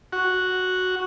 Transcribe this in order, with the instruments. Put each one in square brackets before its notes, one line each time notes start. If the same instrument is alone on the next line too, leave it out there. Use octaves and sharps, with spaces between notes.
[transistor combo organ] F#4